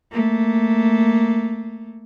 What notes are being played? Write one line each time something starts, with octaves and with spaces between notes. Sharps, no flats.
A3 A#3